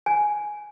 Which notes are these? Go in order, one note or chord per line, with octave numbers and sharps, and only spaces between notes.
G#5